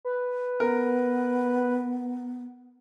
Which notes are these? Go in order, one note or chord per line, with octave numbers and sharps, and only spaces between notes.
B4
B3 A#4